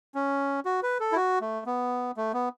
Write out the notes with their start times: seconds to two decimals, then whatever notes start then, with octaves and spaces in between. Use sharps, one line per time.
0.15 C#4
0.65 F#4
0.83 B4
1.00 A4
1.12 E4
1.16 F#4
1.41 A3
1.66 B3
2.17 A3
2.34 B3